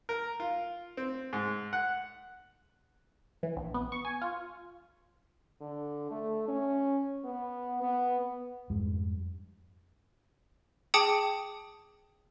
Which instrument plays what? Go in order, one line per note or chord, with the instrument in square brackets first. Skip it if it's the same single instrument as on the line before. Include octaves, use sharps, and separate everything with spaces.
[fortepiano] A#4
F4
C4
G#2
F#5
[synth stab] E3
A#1
B3
C#6
G#5
F4
[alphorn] D3
A3
C#4
B3
B3
[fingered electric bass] F2 G#2 G3 G#3
[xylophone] G#4 G5 A5 D6 D#6 C#7